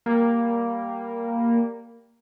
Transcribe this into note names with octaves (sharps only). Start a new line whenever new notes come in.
G3 A#3